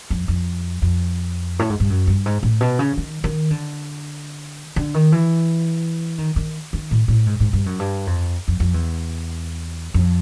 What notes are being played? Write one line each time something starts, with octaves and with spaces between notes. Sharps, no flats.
F2
F2
F2
A2
G#2
G2
F#2
G2
G#2
A2
B2
C#3
D#3
D#3
D3
D3
D#3
E3
D#3
D#3
D#3
A2
A2
G#2
G#2
G2
F#2
G2
F2
F2
F2
E2
F2